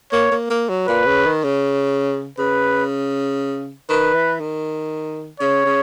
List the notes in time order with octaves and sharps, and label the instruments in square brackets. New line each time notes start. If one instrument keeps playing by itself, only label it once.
[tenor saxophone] A#3 [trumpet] C#5
[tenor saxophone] A#3
A#3
F#3
[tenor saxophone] A#2 [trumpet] B4
[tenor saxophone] C#3
D#3
C#3
[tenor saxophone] C#3 [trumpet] B4
[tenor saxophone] D#3 [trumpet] B4
[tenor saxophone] E3
D#3
[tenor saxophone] C#3 [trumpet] C#5
[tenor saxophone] C#3